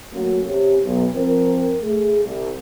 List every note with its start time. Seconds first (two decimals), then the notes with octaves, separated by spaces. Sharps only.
0.14 F#3 A3 A#3 C#4 F#4
0.47 C3 C#4 G4
0.84 B1
1.15 F3 C4 A#4
1.82 A3 G#4
2.22 C2